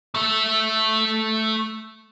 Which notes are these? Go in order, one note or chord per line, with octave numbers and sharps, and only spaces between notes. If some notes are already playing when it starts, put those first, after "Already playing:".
A3 E5